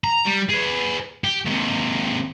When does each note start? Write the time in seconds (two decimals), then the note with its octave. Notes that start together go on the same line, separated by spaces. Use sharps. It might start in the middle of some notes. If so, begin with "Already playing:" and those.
0.04 A#5
0.25 G3
0.49 G#4 B4
1.24 G4
1.45 D#2 C3